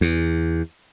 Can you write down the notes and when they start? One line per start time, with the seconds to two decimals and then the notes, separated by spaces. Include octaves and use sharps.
0.01 E2